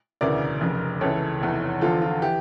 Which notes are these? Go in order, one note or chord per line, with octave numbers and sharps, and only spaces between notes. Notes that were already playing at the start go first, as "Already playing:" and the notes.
E1 D2 C#3 E3 A#4 D5
F1 F2 C#3
C#2 C#3 E3 A4 C#5
F1 E2 E3
E2 D3 F3 F4 A4
F4
E3 G4